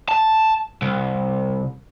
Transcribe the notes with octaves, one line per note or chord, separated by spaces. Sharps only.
A5
C2